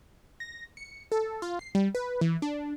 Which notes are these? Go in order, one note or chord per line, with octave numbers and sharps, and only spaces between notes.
A#6
C#7
A4
F4
C7
G3
B4
E3
D4